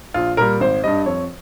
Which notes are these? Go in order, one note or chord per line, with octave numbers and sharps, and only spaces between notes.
A#1 F4
A#2 G3 A#4
G#1 C5
G2 G3 D#5
F2 C#5